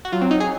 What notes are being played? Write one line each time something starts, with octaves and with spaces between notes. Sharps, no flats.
F#4
F#3 F4
C4
D#4
G#4